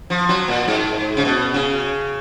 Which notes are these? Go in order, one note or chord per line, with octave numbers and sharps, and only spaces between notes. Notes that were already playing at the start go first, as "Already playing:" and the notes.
F3
F#3
A#2
G#2
C#3
B2
C#3